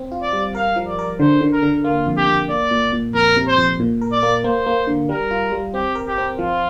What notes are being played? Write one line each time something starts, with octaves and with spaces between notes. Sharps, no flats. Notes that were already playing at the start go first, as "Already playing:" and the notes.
Already playing: C4
F4
D5
G3
A#4 F5
F3
D5
A#4
D3 C5
D3
A#4
D3
A#3 F4
F2
G4
F2
A#3 D5
A#2
A#2
F2 A#4
C3
C5
F2
A#2
A#4
D5
A#3
A#3 C5
A#3
D3
G3 A#4
F4
G3
C4 G4
A#4
G4
C4
F3 F4